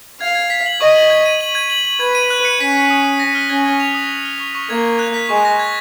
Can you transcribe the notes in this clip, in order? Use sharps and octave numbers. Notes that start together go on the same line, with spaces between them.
F5 G#6
G#6
B6
F#7
D#5 C#6
F#7
G#6
D#7
F#7
G#6
F#7
F#7
B4 G#6
D#7
F#6
C#7
C#4 B6
B6
D#6
D#6
A#6
F6
C#4 G#6
G#6
F7
D#6
A#6
F6
C#6
C#6
A#3 G#6
G#6
F#6
B6
G#3 C#6
A#6
G#6